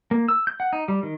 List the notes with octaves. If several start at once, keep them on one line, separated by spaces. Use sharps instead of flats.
A#3
E6
G6
F#5
D#4
G3
D#3